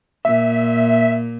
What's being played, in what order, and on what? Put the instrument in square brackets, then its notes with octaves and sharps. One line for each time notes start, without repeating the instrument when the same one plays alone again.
[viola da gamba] A#2 [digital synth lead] E5